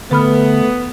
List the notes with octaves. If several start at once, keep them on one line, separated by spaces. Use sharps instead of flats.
D3 A3 B3 B4 B5 F6